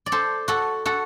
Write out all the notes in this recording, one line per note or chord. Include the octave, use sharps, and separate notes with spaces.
D5
A4 C5
F#4 A4
F#4 A4